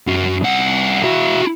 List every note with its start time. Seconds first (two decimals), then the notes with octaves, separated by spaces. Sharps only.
0.07 F#2
0.44 C2 F#5
1.04 E4 F#4